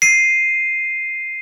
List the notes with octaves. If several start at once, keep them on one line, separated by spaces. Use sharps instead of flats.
C7 D#7